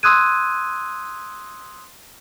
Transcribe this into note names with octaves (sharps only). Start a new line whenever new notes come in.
C6 D#6 E6 F#6 G#6 D#7